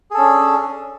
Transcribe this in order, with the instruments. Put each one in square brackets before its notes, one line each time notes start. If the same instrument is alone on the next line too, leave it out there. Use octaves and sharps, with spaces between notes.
[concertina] G#4
A4
C#4
D4